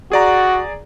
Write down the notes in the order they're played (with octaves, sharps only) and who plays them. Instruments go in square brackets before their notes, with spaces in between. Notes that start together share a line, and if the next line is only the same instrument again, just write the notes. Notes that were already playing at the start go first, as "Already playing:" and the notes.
[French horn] F#4 [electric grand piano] G#4 D5 A#5